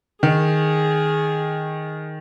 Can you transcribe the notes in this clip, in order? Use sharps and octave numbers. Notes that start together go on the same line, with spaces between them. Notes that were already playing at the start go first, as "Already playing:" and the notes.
D#3 G#4